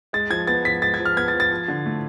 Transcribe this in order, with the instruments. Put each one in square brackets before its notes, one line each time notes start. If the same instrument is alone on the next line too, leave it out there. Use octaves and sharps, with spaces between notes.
[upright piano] G#3 [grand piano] A6
[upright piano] F3 [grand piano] G#6
[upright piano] B3 [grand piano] A6
[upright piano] F3 [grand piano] B6
[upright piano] G#3 [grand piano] A6
[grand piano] G#6
[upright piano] F3
[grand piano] F6
[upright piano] B3 [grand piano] G#6
[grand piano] A6
[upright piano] F3
[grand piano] A6
[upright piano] F3
D3
A3